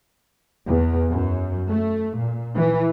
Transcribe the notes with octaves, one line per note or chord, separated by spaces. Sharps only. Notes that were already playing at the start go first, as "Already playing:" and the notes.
E2
F#2
A3
A#2
E3